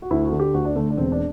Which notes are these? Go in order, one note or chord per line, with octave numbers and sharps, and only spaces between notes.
F#4
D2 E4
F#4
D3
G4
D2 F#4
D4
D3 A3
D4
E1 C4
D4